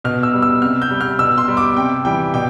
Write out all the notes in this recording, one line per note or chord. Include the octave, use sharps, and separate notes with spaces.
B2 F6
E6
G3
E6
C3 F6
G6
G3
F6
B2 E6
C6
G3
D6
C3 G5
E3 G3 G5
B2 G5